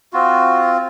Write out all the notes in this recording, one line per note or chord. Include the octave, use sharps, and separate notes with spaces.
C4 F4 F#4